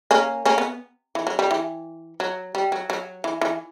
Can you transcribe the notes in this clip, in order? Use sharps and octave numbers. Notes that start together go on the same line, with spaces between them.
A#3 C#4
A#3 C#4
B3
E3
F#3
G3
E3
F#3
G3
F#3
F#3
E3
E3